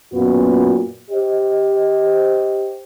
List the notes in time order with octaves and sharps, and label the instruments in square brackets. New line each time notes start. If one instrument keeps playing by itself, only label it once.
[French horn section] F#2 A#2 B3 F4 F#4
G4 C5 D#5